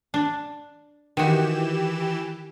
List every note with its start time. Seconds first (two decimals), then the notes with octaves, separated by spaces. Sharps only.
0.14 D4
1.17 D#3 E3 F#4 G4 E7